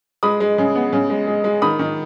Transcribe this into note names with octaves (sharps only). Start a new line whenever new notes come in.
G#3 B5 D#6
G#3
C#3
B3
C#3
G#3
G#3
G#3
D#3 B5 D#6
D#3